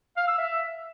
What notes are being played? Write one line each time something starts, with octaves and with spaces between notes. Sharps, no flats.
F5
E6
E5